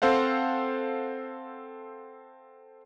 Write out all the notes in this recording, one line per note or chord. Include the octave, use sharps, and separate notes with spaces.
C4 A4 C5 F5 F#5